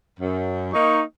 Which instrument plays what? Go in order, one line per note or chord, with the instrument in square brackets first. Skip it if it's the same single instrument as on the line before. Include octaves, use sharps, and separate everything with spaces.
[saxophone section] F#2
[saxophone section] A#3 D#4 [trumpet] C#6